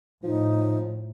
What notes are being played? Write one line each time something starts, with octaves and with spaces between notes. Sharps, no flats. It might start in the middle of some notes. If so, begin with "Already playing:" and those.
A2 F3 D#4